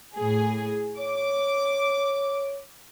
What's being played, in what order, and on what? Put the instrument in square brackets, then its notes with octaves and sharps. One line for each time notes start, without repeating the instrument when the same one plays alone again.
[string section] A2 G#4
[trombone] C#5 [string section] D6